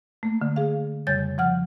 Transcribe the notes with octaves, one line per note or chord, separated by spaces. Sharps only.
A3 A#3
D3
G#4 F5
F2 C#3 G3 C#5 G6 A6
F3 F#5 F6